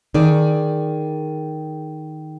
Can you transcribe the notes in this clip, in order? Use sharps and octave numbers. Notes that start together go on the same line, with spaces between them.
D#3 G#4 D5